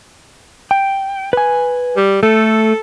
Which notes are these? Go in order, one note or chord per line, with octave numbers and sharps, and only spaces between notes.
G5
B4 G#5
G3
A3 A4